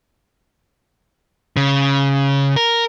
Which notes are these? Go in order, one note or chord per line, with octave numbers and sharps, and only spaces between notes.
C#3
A#4